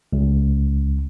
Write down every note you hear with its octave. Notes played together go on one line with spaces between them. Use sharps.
C#2